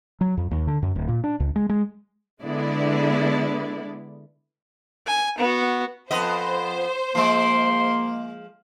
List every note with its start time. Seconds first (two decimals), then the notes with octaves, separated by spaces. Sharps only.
0.21 F#3
0.37 F2
0.51 D#2
0.67 D3
0.83 F#2
0.96 D1
1.08 A#2
1.24 D4
1.40 C#2
1.56 G#3
1.69 G#3
2.42 D3 G#3 B3 D4 E4 D5
5.07 G#5
5.38 B3 F#4
6.11 F2 B3 C5 D#5
7.15 F3 G#3 A#3 C6